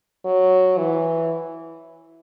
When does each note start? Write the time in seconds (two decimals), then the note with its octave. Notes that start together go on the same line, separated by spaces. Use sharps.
0.25 F#3
0.78 E3